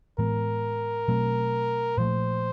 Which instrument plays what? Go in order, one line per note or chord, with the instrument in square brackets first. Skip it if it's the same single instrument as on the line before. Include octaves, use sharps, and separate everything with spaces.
[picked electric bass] A2 E3 G#3 B3 [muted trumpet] A#4
[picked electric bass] B2 F#3 A3 C4
[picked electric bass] A#2 F3 A3 [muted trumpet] C5